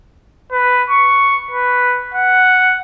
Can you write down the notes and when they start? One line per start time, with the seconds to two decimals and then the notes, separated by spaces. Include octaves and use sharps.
0.52 B4
0.90 C#6
1.51 B4
2.14 F#5